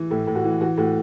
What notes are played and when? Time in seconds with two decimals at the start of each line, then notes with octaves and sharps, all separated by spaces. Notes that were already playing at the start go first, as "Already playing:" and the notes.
Already playing: E3
0.10 A2 E4
0.27 A2
0.35 F#4
0.44 E3
0.61 E3 F#4
0.78 A2 F#4